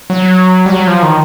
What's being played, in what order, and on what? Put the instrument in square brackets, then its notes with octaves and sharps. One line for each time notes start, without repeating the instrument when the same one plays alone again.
[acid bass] F#3
G3
F#3
F3
D#3